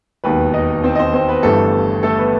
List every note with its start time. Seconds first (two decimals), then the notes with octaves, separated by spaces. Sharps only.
0.24 E1 D#2 D#3 B3 B4
0.54 D#4 D#5
0.83 C4 C5
0.95 D#5
0.99 C4 C5
1.14 C4 C5
1.28 B3 B4
1.43 G1 G2 E3 A3 A4
2.03 A3 A4
2.18 B3 B4